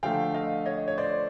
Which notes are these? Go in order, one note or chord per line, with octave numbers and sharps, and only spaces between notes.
D3 F3 A3 F5 G5
D#5 F5
C#5 D#5
C#5
C5 D5